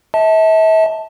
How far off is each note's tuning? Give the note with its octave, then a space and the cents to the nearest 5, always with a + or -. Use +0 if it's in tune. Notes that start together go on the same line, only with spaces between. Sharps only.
E5 -40 A5 +0